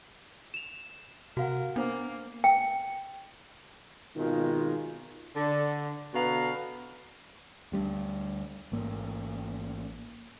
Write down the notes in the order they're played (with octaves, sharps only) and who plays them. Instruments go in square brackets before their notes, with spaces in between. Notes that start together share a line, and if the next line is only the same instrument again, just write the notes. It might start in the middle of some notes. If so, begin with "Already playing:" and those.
[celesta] E7 F7
[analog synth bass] C3 [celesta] F#4 F5 F#5 [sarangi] A#4
[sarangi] A#3 [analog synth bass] B3 [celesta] D4 C5
[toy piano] G5
[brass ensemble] G#1 B2 D#3 G#3 F4
[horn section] D3
B2 D3 B3 F5 A#5
[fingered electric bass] D2 G3 A3 D4
A1 G#2 A#3